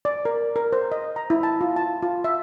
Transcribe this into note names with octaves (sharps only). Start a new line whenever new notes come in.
D5
A#4
A#4
C5
D#5
A#5
E4
A5
F4
A5
F4
E5